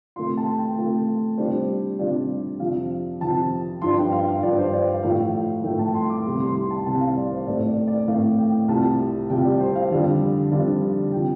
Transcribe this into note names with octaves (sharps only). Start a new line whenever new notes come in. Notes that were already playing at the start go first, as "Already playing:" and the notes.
C3 A3 F4 C6
A5
G5
C3 A3 F4
C3 G3 D4 F4 C5
C3 G3 D4 F4 D5
F2 C3 F3 F5
F2 C3 F3 A5
G2 F3 D4 C6
G5
F5
F5
G2 F3 D4 D5
C5
D5
F5
A2 F3 A3 F5
A2 F3 A3 G5
A5
C6
D6
C2 C3 G3 C6
C6
C6
A5
C2 C3 G3 A5
F5
D5
C5
A2 A3 C4 D5
D5
D5
A2 A3 C4 F5
G5
C2 C3 G3 F4 A5
C2 C3 G3 F4 G5
D5
C5
F5
F2 D3 G3 D4 F4
F2 D3 G3 D4 F4
C3 F3 G5